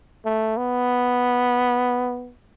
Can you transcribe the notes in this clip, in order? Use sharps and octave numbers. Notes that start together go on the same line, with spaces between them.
A3
B3